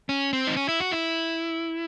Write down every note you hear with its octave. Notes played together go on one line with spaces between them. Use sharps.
C#4
C4
D#4
C#4
E4
F#4
E4